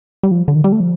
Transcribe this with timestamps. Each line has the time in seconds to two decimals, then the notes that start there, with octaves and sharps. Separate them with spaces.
0.23 G3
0.31 F3
0.48 D3
0.56 D#3
0.64 G3
0.72 A3
0.80 F3